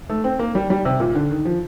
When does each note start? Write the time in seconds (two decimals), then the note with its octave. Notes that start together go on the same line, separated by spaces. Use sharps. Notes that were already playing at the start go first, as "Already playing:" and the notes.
0.10 A3
0.24 C4
0.39 A#3
0.55 G3
0.70 G3
0.85 C3
1.00 A#2
1.15 D3
1.31 D#3
1.45 F3